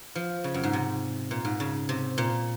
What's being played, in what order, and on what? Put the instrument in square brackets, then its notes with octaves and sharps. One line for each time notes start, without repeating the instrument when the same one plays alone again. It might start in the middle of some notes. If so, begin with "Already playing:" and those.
[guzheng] F3
C#3
F#2
G#2
C3
A#2
G#2
C#3
C3
A#2